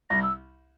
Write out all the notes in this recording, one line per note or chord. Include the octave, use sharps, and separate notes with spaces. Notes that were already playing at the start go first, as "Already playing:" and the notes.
C2 A#6
E6